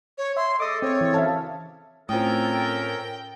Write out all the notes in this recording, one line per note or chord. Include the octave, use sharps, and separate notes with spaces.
C#5
E5 C6
A3 G#4 A4 D#5 D6 D#6
C4 C#5
E3
F#2 C#3 C#4 E5 F5 A5
A2 C4 C#4 F4 A4 A#4 G5 D#6